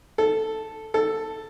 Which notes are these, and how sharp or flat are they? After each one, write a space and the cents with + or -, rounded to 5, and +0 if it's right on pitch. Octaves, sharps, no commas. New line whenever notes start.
A4 +0
A4 +5